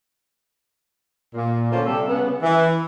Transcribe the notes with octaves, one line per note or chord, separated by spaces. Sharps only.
A#2
D3 A#3 C#4 F4 A4 C5
C3 G3 A4
C#3 B3
E3